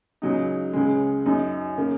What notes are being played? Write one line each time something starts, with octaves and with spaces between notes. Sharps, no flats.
C#2 C#3 F#3 D#4
C#2 C#3 G#3
F#2 F#3 D#4
C#3 A#3